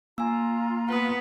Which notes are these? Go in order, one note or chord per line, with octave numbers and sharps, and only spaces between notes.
A#3 F4 G#5 A#5 E6
B3 B4 F#5 D#6